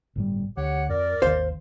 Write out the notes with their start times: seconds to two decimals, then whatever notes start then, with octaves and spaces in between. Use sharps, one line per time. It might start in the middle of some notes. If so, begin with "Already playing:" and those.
0.15 G1 A2 G3
0.57 D2 G4 C#5 F#5
0.89 F2 A#4 D5
1.22 G#1 D#2 D#3 C5 F5